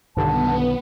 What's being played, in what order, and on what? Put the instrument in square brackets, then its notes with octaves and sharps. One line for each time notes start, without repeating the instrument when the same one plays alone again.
[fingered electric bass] B1 D#3 [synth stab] G2 D3 [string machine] B3 [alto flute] A5